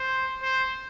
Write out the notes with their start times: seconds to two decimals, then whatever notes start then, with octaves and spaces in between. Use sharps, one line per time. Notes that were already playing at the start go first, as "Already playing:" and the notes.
Already playing: C5
0.43 C5